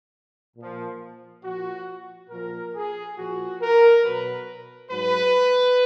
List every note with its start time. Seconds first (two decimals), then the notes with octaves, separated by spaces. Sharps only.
0.57 A#2 F3
1.44 A#2 F3 F#4
2.30 A#2 F3 A#4
2.75 G#4
3.18 A#2 F3 F#4
3.62 A#4
4.04 B2 F#3 B4
4.91 G#2 F#3 B4